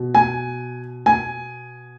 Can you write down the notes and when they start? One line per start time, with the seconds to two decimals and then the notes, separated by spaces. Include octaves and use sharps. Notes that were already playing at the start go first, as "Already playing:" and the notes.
Already playing: B2
0.15 G#5
1.06 G#5